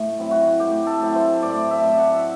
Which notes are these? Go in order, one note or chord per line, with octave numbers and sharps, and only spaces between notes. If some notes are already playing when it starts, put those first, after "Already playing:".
Already playing: A2
F#3 C4 E4
F#4
A2 G4
A4
F#3 C4 E4
C5
A2 D5
E5
F#3 C4 E4
F#5